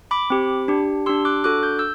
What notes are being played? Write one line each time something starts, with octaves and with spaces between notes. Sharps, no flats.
B5 D6
C4 G4
D4 G4
D4 G4 C6 E6
D6 F#6
D4 F#4 A4 D6 F#6
G6
E6 G6